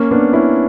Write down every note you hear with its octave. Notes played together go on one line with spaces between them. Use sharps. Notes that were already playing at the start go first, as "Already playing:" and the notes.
Already playing: A#3 C#4
B3 D4
C#4 E4